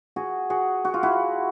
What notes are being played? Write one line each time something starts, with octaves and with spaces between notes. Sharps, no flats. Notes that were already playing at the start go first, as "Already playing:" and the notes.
F#4 G#4
F#4 G#4
F#4
F4
E4 F#4